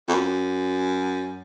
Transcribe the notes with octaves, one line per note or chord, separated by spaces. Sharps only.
F2
F#2